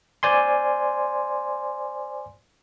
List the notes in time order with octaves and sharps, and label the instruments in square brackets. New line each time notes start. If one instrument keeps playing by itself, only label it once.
[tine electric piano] C5 D5 G#5 C6